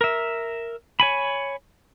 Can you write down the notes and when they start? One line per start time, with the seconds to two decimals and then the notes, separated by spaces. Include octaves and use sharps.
0.01 A#4 E5
1.00 C#5 G#5 B5